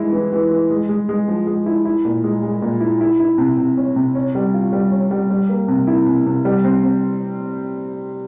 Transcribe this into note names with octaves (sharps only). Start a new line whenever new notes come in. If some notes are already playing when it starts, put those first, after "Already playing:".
Already playing: E3 G#3 E4
E3
E3
E3
G#3
G#3
G#3
F3
G#3
E4
E4
A#2
G#3
G#3
A#2
E4
E4
E4
C3
C3
C#4
C3
C#4
G3
F4
G3
C#4
G3
G3
A#3
C3
E4
C3
C3
G3
C4
C4